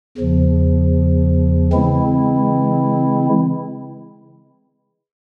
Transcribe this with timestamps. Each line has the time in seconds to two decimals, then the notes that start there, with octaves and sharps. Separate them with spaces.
0.18 E2 C#3 F3
1.73 C#3 E3 G#3 C4 E4